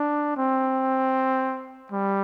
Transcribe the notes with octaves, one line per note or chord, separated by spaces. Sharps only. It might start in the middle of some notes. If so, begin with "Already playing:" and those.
Already playing: D4
C4
G3